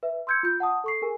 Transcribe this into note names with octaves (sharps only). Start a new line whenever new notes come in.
B4 E5
C6 E6 G6 G#6 C#7
F4 G6
F#5 A5 D#6
A4 C#6 C7
G#4 A#4 G#5